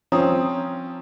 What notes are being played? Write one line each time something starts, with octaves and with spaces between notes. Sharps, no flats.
F3 C4 C#4 A#5 D#6